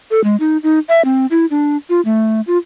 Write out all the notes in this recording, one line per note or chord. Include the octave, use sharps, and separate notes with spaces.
A4
G#3
D#4
D#4
E5
C4
E4
D4
F4
A3
F4